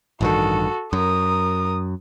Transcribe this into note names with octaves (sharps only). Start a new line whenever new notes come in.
A1 G2 D#3 F#4 A4
F#2 A#4 D#6